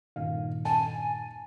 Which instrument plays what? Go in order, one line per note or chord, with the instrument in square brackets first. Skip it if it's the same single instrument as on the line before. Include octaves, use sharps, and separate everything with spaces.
[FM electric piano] G2 A#2 D#3 [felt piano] F5
[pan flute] G#5 [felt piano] A5